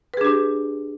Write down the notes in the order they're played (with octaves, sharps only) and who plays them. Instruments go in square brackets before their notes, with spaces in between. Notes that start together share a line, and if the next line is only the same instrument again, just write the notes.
[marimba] B4
G#4
D4
G4